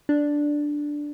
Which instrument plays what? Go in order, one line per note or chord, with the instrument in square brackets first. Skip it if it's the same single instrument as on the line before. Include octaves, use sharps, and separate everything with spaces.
[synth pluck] D4